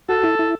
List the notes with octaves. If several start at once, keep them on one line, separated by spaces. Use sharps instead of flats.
F#4 A4
E4
E4